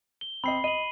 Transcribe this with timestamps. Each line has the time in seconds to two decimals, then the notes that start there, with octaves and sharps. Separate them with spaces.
0.21 G7
0.44 C4 D#5 B5 C7
0.64 D#5 D#7 F#7